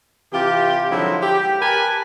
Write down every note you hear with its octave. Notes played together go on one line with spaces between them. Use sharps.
C3 E3 F4 G4
D3 F3 F#3 G#3 D#4 E4
G4
G4 A#4 B4 G#5 A5 B5